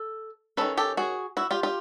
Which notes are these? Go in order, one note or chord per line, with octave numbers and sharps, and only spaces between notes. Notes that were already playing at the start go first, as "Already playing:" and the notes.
Already playing: A4
D#3 G#3 C#4 A4 B4
G4 A4
F#4 G#4
E4 F#4
F4 G4
F4 G4